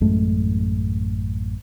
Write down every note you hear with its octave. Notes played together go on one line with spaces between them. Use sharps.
A1 F#2 G#3 A3